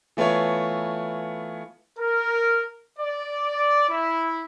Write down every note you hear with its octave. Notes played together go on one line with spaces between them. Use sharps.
E3 A3 B3 F4 C#5
A#4
D5
E4